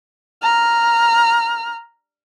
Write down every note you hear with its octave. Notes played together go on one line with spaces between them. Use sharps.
A#5 F6